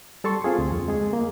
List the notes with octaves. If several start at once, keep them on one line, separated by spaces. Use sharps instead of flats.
G3 A4 A5 C6 C#6
C4 F4 G#4
D2
F2
G#3 G#4
A#3